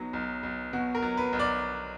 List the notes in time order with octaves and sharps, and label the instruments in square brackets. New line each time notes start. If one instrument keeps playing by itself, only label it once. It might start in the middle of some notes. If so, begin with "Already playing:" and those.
Already playing: [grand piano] B1 B2 F#3 D#4
B1
B1
B2 F#4
A#4
F#3
B4
B1
D5